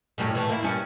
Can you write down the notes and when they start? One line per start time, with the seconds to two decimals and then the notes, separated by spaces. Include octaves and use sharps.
0.18 F#2 A2 G3
0.35 A2 E3
0.49 A#3 E4
0.63 G2 C#4